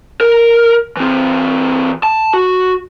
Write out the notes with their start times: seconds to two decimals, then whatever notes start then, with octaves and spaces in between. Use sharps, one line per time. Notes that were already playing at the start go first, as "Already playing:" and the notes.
0.21 A#4
0.97 E3 C4
2.03 A5
2.34 F#4